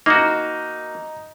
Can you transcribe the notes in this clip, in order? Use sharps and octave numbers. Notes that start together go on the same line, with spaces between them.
A#3 D#4 F#4